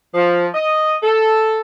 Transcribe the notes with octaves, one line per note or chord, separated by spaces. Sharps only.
F3
D#5
A4